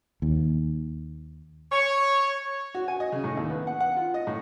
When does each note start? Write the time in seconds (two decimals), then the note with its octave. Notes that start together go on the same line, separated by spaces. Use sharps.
0.22 D#2
1.72 C#5
2.75 F#4
2.88 G#5
3.00 D#5
3.12 C#3
3.24 A2
3.37 D#2
3.50 B3
3.67 F#5
3.80 F#5
3.96 F4
4.14 D#5
4.27 A2